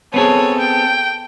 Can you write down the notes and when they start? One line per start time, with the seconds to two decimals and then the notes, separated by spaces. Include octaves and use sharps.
0.14 B3 C4 G#4 A4 C#5
0.59 G5